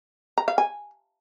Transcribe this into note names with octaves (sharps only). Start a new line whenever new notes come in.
A#5
F5
G#5